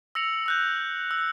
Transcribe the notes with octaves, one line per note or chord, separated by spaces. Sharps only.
E6 A#6 C#7 F7 F#7
E6 F#6 G6
E6